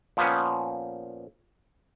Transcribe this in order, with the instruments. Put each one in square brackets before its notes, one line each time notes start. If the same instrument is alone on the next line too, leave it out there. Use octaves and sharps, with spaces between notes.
[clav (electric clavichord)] A#2 F3 B3 C#4